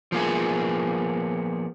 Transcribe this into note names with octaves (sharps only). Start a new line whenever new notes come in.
F3 A#3 B3 G#4